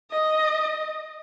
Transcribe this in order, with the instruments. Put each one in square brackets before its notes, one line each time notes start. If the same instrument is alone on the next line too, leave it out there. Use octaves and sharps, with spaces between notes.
[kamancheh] D#5